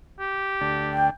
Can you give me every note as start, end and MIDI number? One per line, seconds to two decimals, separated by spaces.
0.19 1.00 67
0.61 1.10 38
0.61 1.10 62
0.93 1.07 79